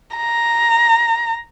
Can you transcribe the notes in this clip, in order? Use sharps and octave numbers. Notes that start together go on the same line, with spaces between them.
A#5